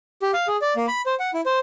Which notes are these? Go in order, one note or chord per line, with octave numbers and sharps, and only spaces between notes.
G4
F5
G#4
D5
A#3
B5
C5
F#5
E4
C5